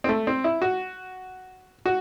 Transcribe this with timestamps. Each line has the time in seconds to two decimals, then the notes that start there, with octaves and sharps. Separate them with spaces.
0.04 C4
0.09 A3
0.27 C4
0.44 E4
0.62 F#4
1.86 F#4